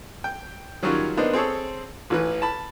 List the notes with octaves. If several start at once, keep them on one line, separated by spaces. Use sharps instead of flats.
G5
D#3 F#3 G3 C#4 F4
A#3 B3 D4 D#4 C5
C4 G#4 A4 C#5
A1 E3 B4
A5 B5